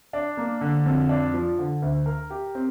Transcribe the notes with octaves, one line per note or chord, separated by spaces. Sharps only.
D4
A#3
D3
F2
D4
F3
D3
D2
A#4
G4
C4